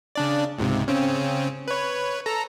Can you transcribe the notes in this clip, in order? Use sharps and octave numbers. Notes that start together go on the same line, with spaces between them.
C#3 D4 D5
C#2 G#2 C3
C#3 C4 C#4
B4 C#5
A4 A#5